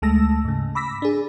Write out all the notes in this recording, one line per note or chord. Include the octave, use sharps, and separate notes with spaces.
D2 G#3 A3 A5 E6 A#6
G#2 C#3
B5 D6 E6 A#6 B6
D4 G#4